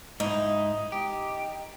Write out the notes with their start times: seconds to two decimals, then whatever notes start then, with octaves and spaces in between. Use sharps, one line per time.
0.20 G#2 D#4 E4
0.92 G4